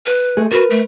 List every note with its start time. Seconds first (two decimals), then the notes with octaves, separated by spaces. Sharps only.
0.06 B4
0.37 A3 G#4
0.52 F#4 A#4 B4
0.70 A3